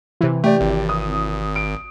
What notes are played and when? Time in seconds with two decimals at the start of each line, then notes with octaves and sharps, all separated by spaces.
0.21 C3 E3
0.44 A3 G4 D5
0.61 G#1
0.89 D#6
1.56 D7